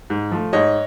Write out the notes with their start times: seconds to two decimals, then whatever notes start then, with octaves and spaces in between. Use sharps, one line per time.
0.10 G#2
0.32 F3 A3
0.53 G#2 C#5 D#5